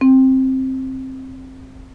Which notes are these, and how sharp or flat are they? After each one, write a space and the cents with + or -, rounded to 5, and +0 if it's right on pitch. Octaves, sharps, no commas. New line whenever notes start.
C4 +10